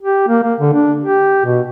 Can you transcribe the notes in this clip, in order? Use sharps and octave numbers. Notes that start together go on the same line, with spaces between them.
G4
A#3
A#3
D3
D4
G4
B2